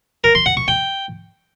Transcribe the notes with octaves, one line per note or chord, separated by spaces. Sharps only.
A#4
C6
F#5
C#6
G5